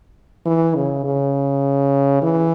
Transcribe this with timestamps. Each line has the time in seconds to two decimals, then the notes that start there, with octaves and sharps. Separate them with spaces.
0.46 E3
0.75 C#3
1.04 C#3
2.22 E3